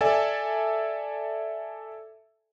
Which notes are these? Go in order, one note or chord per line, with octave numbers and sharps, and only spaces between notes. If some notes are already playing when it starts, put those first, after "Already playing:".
A4 D5 E5 G#5 A5